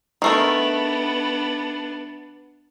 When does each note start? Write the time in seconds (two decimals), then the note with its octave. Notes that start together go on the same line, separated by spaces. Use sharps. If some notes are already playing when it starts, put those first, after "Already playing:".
0.22 D#3 A3 B3 D4 A#4